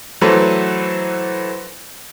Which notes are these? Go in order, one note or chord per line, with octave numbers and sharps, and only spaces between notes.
E3 F#3 A3 A4 B4 C5